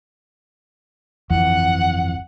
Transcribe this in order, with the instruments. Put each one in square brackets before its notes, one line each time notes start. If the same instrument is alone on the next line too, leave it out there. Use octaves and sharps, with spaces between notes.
[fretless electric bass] G1 F2 E3 [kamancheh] F#5